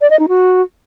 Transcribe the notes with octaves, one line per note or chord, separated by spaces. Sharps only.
D5
D#5
D#4
F#4